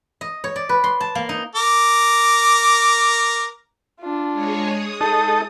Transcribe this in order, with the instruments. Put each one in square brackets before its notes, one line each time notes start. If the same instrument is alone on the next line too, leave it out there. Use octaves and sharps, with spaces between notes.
[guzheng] D#5
C#5
D5
B4
C6
A5
A#3
D#4
[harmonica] A#4 D6
[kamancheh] D4 F4
[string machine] G#3 G#4 C#5
D#6
[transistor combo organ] D#4 A4 [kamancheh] G#4